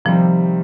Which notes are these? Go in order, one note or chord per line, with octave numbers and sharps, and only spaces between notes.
C3 D#3 F3 G3 C4